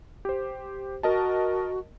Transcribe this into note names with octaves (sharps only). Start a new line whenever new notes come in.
G4 C5
F#4 A#4 D#5 A5